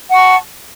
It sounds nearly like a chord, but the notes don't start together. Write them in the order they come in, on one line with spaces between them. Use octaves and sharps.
F#5 C#6 A5